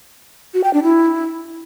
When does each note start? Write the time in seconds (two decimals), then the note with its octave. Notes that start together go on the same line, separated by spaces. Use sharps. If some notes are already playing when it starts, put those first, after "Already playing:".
0.54 F#4
0.64 G5
0.74 D4
0.83 E4